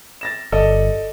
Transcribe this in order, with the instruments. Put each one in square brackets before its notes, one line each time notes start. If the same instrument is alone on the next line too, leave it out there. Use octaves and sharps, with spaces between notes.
[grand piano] A6 A#6 E7
[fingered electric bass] G1 [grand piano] A4 D5 D#5